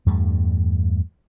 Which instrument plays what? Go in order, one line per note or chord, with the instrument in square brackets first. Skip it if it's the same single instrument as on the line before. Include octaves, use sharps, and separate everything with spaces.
[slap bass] E2 G2 G3 A3